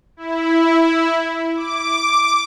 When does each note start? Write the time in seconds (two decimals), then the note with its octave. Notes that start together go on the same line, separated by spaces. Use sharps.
0.17 E4
1.56 D6